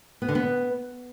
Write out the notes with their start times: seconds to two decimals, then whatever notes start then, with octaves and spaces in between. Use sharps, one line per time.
0.22 B3
0.28 D3
0.35 B3